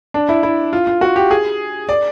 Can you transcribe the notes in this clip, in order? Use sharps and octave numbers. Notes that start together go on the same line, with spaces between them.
D4
E4
E4
F4
F4
F#4
G4
G#4
D5